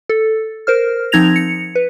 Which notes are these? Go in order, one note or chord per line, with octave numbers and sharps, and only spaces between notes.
A4
A#4 C5 F6
F3 C4 D#4 G#6 A#6 F7
C#7
B4